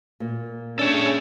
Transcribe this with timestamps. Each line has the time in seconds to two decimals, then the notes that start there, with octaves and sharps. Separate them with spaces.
0.20 A#2 A#3
0.79 C#4 D4 G#4 A4 C#5